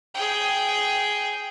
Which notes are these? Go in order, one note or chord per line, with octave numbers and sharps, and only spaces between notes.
G#4 G5